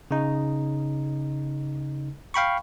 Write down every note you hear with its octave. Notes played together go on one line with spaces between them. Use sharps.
C#3 D#4
F5 G5 B5 C#6